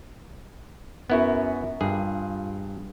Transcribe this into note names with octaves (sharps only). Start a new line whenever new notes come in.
F#2 B3 E4 F#4
G2 F4 G#4